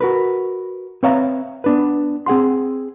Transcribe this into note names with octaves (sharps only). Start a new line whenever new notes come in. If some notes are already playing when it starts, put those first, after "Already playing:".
F#4 A#4 B4
C4 B4 C#5 E5 F5 A#5
B3 D4 B4
C4 G#4 F#5 C6